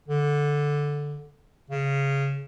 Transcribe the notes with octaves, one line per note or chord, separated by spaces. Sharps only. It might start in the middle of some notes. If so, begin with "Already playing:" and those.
D3
C#3